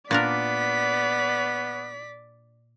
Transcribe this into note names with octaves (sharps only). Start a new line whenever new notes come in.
A#2 B3 D4 A#4 D5 B6